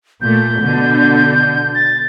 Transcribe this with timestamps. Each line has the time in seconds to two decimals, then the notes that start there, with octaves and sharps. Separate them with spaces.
0.21 A#2 A3 G6
0.60 B2 D3
1.75 A6